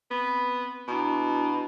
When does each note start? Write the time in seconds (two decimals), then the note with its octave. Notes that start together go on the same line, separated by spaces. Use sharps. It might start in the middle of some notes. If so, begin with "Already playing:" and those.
0.11 B3 C4
0.88 B2 D4 E4 A#5